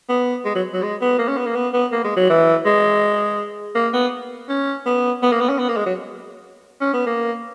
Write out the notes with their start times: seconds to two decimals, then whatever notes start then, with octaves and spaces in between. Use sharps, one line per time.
0.09 B3
0.45 G#3
0.55 F#3
0.74 F#3
0.83 G#3
1.01 B3
1.19 A#3
1.28 C#4
1.37 B3
1.46 A#3
1.56 B3
1.74 B3
1.92 A#3
2.04 G#3
2.17 F#3
2.30 E3
2.66 G#3
3.75 A#3
3.94 B3
4.49 C#4
4.86 B3
5.23 B3
5.32 A#3
5.41 B3
5.49 C#4
5.59 B3
5.69 A#3
5.77 G#3
5.86 F#3
6.81 C#4
6.94 B3
7.06 A#3